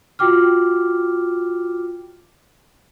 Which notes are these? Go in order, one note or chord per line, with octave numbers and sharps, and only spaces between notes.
F4 F#4 G5 D6 F6